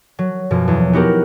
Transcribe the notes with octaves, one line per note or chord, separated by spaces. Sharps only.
F#3
F#2 B2 F3
E2
B3 D#4 F#4 G4 A#4